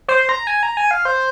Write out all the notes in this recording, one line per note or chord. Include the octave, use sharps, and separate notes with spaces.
C5
A#5
G#5
A#5
G#5
F5
C5